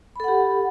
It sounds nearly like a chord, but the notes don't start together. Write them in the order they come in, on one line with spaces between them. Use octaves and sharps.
B5 A4 F#5 G4